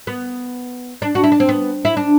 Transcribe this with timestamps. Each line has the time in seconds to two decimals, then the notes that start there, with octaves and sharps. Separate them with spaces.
0.07 B3
1.02 D4
1.15 F#4
1.24 E4
1.32 D4
1.40 C4
1.49 B3
1.85 E4
1.97 D4